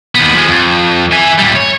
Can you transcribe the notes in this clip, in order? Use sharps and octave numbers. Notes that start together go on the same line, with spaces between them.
D#2 B3
F3 G#3
F2
E5 G#5
A#2 G3
C#5